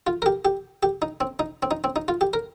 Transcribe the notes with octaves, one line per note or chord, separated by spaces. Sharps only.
F4
A#4
G4
G4
G4
D#4
C4
D#4
C4
D#4
C4
D#4
F4
G4
A#4